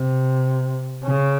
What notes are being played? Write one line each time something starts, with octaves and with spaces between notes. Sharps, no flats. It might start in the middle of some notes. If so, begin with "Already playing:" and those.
Already playing: C3
C#3